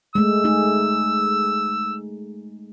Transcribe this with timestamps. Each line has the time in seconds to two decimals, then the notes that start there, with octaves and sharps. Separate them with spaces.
0.15 G#3 A3 E6
0.44 A3 D#4 G#4